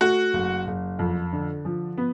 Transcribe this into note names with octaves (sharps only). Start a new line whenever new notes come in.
A3 F#4
F#1
F#1
F2
D3
F3
B3